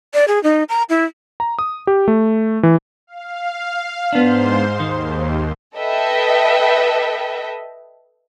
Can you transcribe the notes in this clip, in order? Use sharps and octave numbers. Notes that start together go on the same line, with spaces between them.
D5
G#4
D#4
A#5
E4
A#5
D#6
G4
A3
E3
F5
G#2 B3 D4 C5 C6
D#2 D#3
A4 B4 D#5 E5 G5